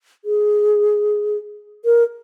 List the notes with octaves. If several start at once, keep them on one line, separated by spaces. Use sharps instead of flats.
G#4
A#4